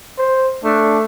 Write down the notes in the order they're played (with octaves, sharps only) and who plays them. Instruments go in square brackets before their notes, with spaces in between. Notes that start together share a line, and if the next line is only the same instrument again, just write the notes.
[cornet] C5
[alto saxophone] A3 [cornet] D4